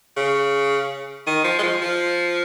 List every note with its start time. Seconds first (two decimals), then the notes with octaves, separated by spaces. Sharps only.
0.16 C#3
1.27 D#3
1.44 F3
1.59 G#3
1.63 F3
1.82 F3